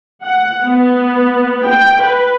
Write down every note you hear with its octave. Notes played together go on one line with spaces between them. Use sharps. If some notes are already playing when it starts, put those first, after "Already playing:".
F#5
B3
G5
B4